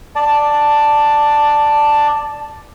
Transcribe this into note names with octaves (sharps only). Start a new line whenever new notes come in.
D5 A5